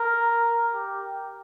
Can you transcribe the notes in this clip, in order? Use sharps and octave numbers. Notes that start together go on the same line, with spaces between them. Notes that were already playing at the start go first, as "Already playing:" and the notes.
Already playing: A#4
G4